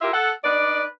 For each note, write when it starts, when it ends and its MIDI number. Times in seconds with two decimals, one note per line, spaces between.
0.01 0.12 64
0.01 0.12 65
0.01 0.12 67
0.01 0.12 70
0.01 0.12 76
0.13 0.32 69
0.13 0.32 78
0.44 0.84 62
0.44 0.84 63
0.44 0.84 71
0.44 0.84 74